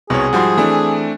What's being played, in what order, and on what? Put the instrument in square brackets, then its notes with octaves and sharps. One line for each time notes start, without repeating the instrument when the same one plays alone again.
[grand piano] C2 [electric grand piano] B2 C#5 [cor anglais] G#4
[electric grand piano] G#2 F3 G3 [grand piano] F#4 C6
[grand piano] E3 [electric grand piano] A3 C4 D4